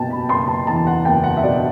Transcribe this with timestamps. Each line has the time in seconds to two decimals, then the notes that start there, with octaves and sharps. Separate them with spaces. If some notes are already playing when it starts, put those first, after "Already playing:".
Already playing: F#1 B2 G5 A5
0.10 B5
0.29 F#1 C6
0.48 A5
0.67 E2 A5
0.87 F#5
1.05 F#1 G5
1.24 F#5
1.37 E5
1.43 B2 D5